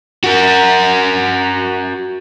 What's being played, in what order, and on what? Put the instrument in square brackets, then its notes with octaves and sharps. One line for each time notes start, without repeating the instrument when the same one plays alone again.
[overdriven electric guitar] F#4 A#4